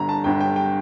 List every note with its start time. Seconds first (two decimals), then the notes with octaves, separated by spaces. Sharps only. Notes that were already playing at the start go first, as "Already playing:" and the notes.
Already playing: G1 G2 D3 A#5
0.09 A5
0.24 G1 G2 D3 G5
0.41 G5
0.56 G5